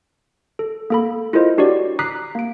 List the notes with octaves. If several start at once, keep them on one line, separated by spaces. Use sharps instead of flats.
A4
A#3 A4 B5
E4 F4 A4 A#4 C5 D#5
D4 F#4 G4 C#5 D5
A#5 D6 D#6 F#6 B6 C7
A#3 D7